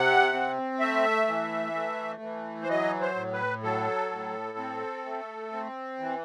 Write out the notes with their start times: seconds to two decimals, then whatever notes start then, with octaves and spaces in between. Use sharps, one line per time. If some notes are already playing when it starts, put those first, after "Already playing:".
Already playing: C3 F#5
0.33 C4
0.80 A3 E5
1.28 E3
1.75 A3
2.22 E3
2.63 C5
2.69 F#3 D#5
3.01 C5
3.16 A2
3.32 B4
3.63 F#3 A4
4.11 A2
4.58 C4
5.06 A3
5.52 C4
6.00 E3